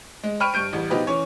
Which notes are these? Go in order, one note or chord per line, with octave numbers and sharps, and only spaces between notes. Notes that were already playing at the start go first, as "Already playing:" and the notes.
G#3
G5 B5 C#6 F6 D7 D#7
G2 C#6 G6 D7
A1 G3
B2 F3 D#4 G4 B4
E3 C#4 C#5